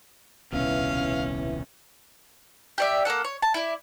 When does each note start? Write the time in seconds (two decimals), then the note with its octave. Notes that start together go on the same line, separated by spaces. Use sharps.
0.53 D#1 C2 B2 C#4 E4 B4 E5 F5
2.78 G4 D5 E5
3.05 A#3 C#4 A4 F#5
3.25 C#5
3.42 A5
3.54 E4 D5